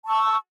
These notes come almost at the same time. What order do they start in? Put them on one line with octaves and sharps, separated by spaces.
A5 C#6 E6